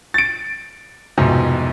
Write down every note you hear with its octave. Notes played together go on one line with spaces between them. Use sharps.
A6 D7
C2 F2 G#2 B2